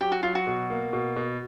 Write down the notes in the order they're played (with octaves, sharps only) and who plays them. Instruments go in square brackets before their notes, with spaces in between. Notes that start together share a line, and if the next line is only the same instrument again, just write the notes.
[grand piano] F#3 [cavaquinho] G4
[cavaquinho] F#4
[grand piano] F#3 [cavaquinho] F4
[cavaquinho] F#4
[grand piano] B2
A#3
B2
B2